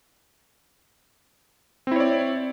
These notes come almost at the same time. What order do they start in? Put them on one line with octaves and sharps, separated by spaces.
C4 E4 C#5 D5